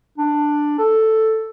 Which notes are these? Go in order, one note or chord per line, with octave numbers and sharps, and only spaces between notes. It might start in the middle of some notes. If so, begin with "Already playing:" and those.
D4
A4